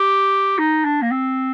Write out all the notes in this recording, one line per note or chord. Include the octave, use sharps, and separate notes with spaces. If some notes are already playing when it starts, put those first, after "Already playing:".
Already playing: G4
D#4
D4
A#3
C4